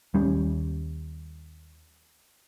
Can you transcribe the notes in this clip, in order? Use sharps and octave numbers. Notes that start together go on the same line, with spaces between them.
D#2 G3 C#4